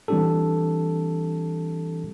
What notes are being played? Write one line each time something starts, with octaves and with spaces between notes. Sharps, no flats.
E3 G3 C4 D4 G4 A4